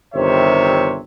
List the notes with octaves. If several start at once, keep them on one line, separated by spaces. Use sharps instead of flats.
G1 C3 D#3 C5 C#5 E5